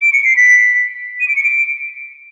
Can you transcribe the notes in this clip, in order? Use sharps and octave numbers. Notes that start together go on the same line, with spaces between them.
D7
C#7
C7
B6
D#7
D7
C#7
D7